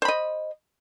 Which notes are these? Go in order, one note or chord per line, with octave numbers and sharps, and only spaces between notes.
C5 D#5 B5